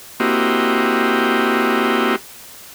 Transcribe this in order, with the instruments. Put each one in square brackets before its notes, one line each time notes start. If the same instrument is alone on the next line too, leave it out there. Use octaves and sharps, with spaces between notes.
[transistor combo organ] A#3 C4 E4 F#4 G4 D#5